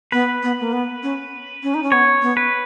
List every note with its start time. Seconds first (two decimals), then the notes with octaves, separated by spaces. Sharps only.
0.12 B3 B4
0.43 B3
0.60 A#3
0.73 B3
1.03 C#4
1.63 C#4
1.74 D#4
1.83 C#4
1.92 B3 C#5
2.22 B3
2.37 B4